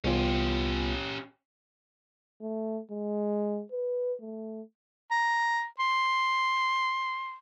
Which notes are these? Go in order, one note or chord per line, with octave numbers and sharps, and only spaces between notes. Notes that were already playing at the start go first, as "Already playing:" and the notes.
C2 B3 C#4 F4 G4
A3
G#3
B4
A3
A#5
C6